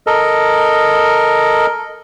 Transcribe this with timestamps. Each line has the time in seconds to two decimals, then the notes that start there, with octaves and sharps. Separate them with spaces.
0.07 A4 A#4 D#5